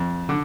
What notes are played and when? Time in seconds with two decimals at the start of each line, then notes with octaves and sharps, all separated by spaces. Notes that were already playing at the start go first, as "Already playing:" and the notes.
Already playing: F2
0.29 D3